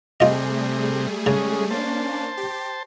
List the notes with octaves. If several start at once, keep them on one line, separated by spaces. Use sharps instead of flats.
C3 G3 A3 F4 G#4 D#5
C#3 G#3 C#4
A#3 C#4 D4 C5 A5
G4